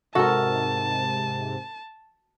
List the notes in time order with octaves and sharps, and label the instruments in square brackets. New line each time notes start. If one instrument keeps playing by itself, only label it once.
[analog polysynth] G#2 C3 [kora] F#4 [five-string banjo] A4 A#4 [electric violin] A5